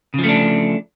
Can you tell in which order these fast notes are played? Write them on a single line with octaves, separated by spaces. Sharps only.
C#3 F3 A3 D4